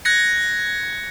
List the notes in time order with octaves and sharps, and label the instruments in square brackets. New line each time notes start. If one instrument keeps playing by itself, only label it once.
[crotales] F#6 G#6 A#6 C#7